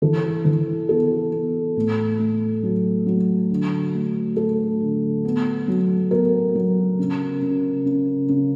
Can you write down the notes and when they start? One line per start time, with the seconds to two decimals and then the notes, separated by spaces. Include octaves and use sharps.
0.02 E3 A4
0.45 E3
0.89 B3 A4
1.32 B3
1.76 A2
2.19 A3
2.63 F#3
3.06 F#3
3.50 D3
3.94 A3
4.37 A3 A4
4.81 D3
5.25 B3
5.68 F#3
6.11 B3 A#4
6.55 F#3
6.99 C#3
7.42 C#3
7.86 C#3
8.29 C#3